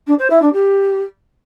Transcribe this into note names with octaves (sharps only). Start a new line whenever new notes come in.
D4
C5
E4
D4
G4